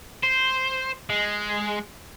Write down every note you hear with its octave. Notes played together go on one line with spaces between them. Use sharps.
C5
G#3